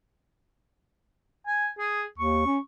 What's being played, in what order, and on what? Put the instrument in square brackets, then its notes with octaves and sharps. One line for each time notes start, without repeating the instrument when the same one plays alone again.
[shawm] G#5
G#4
[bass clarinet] D#2 [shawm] C#6
[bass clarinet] C#4